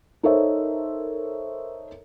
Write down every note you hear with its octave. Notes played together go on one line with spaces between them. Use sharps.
D#4 A4 A#4 C5 C#5 E5